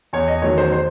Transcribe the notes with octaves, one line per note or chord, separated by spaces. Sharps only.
E2 C#5
D#5
D#3 F#3 A3 C#5
C5
C5